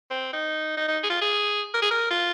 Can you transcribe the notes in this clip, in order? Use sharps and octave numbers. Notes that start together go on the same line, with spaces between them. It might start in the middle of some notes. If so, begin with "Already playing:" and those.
C4
D#4
D#4
D#4
G#4
F4
G#4
A#4
G#4
A#4
F4